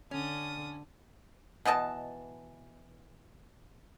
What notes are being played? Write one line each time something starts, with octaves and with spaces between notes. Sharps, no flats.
D3 C#4 A5 D#6
B2 E3 D#5 A5